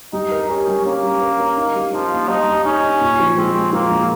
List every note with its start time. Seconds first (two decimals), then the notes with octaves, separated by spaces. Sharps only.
0.13 G3 D#4
0.31 A#4
0.49 C#4 G4
0.68 G3
0.85 A#3 C#4
1.03 G3
1.21 A#4
1.40 C#4
1.57 D#4
1.76 G3
1.93 F3 D#4
2.12 A#3
2.29 G3 D#4
2.47 G3
2.65 C#4 D#4
2.84 D#4
3.01 A#2
3.20 F3
3.38 G#3 C4
3.55 G#3
3.73 F3 A#3
3.91 A#2